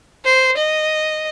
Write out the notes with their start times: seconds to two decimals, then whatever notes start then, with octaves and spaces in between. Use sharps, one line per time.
0.25 C5
0.57 D#5